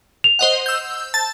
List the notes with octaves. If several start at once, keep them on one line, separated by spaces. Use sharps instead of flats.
F7
C5 D#5 F#5
E6 G6
A5 A6